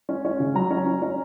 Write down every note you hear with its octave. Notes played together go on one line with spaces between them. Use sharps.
C#4
C#4
C#3
F#3 A#5
C#4
C#4
C#4